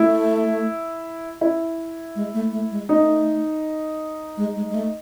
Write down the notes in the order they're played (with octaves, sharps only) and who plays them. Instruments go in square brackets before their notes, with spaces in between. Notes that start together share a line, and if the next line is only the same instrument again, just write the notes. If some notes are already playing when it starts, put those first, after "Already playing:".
Already playing: [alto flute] A3 [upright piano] E4
[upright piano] E4
[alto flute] G#3
A3
A3
G#3
[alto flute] A3 [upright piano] D#4
[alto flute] G#3
G#3
G#3
A3